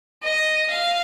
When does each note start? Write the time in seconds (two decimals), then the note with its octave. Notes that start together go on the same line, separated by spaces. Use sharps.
0.23 D#5
0.71 F5